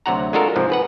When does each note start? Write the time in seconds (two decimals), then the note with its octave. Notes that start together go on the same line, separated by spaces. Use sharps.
0.06 D2 C3 F#3 F#4 F#5 A#5
0.33 G#3 D4 F4 F#4 A4 A#4
0.56 G#2 C3 F3
0.70 G#4 B4 F#5